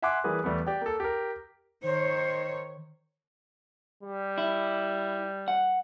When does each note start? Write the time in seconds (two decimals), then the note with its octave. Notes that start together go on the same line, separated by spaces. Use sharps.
0.02 E5 F#5 G#5 C6 D6 F#6
0.24 E3 G3 A#3 G#4 B4
0.44 E2 G3 A3 B3
0.67 G4 D5 G5
0.81 A#3 A4
1.00 G4 A#4
1.83 D#3 C5 C#5
4.03 G3
4.38 E4
5.48 F#5